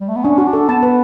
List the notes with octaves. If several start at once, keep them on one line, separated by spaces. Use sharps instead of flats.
G3
A3
B3
C#4 D4
C#4 F#4
D4
A4
B3 A5
B4